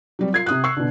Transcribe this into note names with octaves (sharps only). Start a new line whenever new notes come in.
F#3 G3 C4
F4 G#6 C7
C3 D#6 F#6
C#6 E6 C7
B2 D3